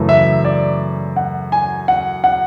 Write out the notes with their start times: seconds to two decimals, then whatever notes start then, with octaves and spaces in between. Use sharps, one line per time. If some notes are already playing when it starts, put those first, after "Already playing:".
Already playing: F#2 C#3 E3 A3
0.09 E5
0.45 D5
1.16 F#5
1.52 G#5
1.88 F#5
2.24 F#5